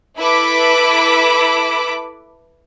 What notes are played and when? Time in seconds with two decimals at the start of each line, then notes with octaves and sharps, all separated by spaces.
0.20 E4 A4 B4 B5 D6 B6